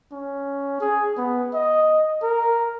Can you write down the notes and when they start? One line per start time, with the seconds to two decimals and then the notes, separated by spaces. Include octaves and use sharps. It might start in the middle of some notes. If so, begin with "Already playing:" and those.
0.12 C#4
0.81 G#4
1.17 B3
1.54 D#5
2.23 A#4